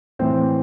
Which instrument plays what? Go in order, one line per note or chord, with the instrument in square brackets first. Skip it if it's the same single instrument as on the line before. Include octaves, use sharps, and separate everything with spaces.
[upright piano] A2 E3 C4